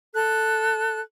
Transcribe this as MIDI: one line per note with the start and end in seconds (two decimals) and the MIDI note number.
0.14 0.98 69
0.14 0.98 90